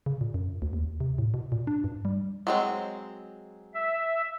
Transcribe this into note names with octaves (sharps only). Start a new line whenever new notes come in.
C#3
A#2
F#2
D2
D#2
C3
A2
B2
A#2
D4
G2
G3
F#3 G#3 C4
E5